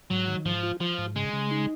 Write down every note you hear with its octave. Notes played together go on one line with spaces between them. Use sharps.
G#2 F#3
D#3
G#2 F3
F4
F3 F4
G#2
C#3 G#3
C#3
D#4